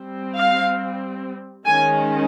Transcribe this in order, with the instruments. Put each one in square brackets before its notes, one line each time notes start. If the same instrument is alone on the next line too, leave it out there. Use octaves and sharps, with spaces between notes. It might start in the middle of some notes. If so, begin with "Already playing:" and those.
Already playing: [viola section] G3 C4
F5
D#3 G#3 C#4 G#5